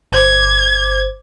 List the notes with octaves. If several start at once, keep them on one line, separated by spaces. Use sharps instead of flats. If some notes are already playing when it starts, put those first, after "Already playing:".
G1 C5 D6 G#6